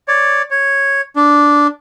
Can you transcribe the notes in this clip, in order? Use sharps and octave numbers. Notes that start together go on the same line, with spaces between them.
C#5 D5
C#5
D4